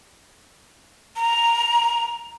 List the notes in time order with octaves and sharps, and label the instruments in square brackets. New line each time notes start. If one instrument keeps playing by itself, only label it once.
[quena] A#5